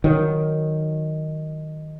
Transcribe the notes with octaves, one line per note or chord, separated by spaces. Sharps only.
D#3 F#3